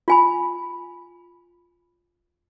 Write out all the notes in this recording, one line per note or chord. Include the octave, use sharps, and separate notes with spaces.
F4 G#5 B5